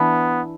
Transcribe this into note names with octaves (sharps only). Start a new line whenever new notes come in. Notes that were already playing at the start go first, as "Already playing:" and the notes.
Already playing: E3 B3 D4 E4